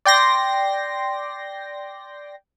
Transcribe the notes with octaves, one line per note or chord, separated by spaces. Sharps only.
D5 G5 C6 A#6